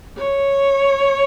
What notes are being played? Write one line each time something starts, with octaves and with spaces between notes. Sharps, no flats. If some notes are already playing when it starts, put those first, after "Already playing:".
C#5